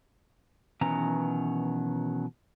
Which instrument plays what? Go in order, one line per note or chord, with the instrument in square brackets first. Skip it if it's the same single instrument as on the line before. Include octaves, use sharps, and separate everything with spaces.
[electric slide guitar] B2 D#3 E3 F#3 C#4 A#5